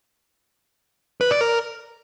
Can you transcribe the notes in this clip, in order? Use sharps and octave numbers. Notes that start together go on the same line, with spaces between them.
B4
D5
A#4